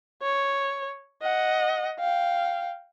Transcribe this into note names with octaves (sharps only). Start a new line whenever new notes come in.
C#5
D#5 F#5
F5 G5